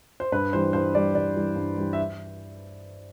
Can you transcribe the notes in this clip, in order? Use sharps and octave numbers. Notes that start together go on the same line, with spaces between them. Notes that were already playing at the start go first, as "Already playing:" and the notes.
C5
G2 B4
E3 G3 C5
G2 C5
E3 G3 D5
G2 D5
E3 G3
G2
E3 G3
E5